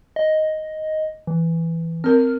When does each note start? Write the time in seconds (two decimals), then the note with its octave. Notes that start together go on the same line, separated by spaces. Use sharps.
0.16 D#5
1.27 E3
2.04 C4 A#4 F6